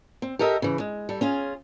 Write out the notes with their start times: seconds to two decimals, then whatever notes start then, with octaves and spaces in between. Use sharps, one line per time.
0.22 C4
0.39 G4 A4 A#4 D#5 E5
0.62 C#3 E3
0.80 G#3
1.09 G3 A4
1.21 C#4 F4 G#4